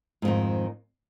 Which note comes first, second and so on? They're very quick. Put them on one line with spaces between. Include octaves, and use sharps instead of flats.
G#2 F2 D#3